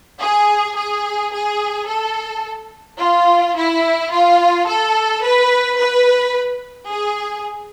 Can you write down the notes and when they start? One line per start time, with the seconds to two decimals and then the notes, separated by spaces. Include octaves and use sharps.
0.20 G#4
0.76 G#4
1.32 G#4
1.87 A4
2.99 F4
3.56 E4
4.11 F4
4.67 A4
5.23 B4
5.78 B4
6.90 G#4